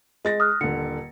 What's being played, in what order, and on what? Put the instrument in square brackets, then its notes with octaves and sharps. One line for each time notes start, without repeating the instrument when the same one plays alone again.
[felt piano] G#3 A6 A#6 [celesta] D#5
[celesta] D#6 F6 F#6
[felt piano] D#1 D3 [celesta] C#7